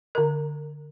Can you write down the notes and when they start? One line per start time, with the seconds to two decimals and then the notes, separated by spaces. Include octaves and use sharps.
0.15 D3 A#4